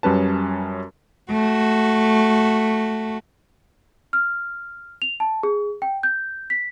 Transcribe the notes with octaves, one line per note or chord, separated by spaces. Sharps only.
F#2 G3 C#4 B4 A5
A3 F#4
F6
F7
A5
G#4
G5
G6
B6